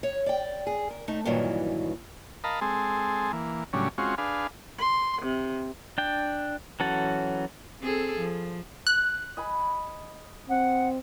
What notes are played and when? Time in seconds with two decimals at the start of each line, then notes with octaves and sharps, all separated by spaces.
0.03 C#5
0.26 D5 G5
0.67 G#4
0.90 A#4
1.08 A3 D#4
1.25 G2 A#2 D#3 E3 F#3
2.44 A#4 D#5 F5 A5 B5
2.61 G#3 C4 G#4 A4
3.33 E3 A#3
3.73 A2 C#3 F#3 G3 C#4 D4
3.98 G#3 C4 C#4 F4 F#4
4.18 D4 G#4 B4 F5
4.78 C6
5.21 C3
5.98 D4 G5
6.80 E3 F#3 C#4 F#4 A4
7.81 C4 G#4 A4
8.18 F3
8.87 F#6
9.37 D#5 G#5 B5
10.49 C4 F#5